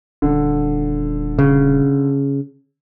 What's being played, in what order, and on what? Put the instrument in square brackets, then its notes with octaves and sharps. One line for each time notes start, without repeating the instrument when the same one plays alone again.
[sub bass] D#1 [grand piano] D3
[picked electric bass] C#3